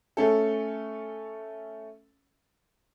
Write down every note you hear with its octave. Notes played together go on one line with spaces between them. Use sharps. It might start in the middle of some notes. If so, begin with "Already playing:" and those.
A3 C#4 A4